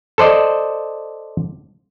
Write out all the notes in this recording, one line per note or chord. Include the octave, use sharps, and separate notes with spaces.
A4 C5 D5 D#5